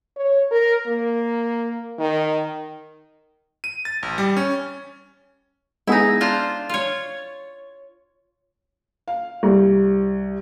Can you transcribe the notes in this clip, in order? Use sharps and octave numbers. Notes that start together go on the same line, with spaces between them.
C#5
A#4
A#3
D#3
D#7
A6
A1
G3
C#4
G#3 B3 D#4 E4 G#4
D4 F4 C5
F4 C#5
F5
C2